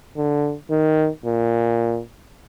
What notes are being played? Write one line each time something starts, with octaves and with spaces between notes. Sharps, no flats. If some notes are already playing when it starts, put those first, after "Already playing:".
D3
D#3
A#2